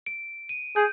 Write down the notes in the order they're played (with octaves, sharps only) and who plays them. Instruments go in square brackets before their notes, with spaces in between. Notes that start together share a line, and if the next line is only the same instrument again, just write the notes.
[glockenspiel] D7
D#7
[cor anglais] G#4 [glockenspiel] G6